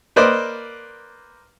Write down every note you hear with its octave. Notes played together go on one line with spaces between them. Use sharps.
A#3 B4 C5 D5 D#5